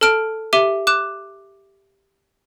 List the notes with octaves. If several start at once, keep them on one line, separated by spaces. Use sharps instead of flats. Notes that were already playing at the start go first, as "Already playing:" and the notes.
A4 A5 F6 D7
G4 E5 D6 D#7 G7
D6 F#6 E7